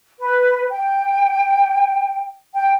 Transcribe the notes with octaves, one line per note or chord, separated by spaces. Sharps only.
B4
G5
G5